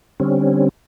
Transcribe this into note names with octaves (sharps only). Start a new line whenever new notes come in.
D3 G3 C4 C#4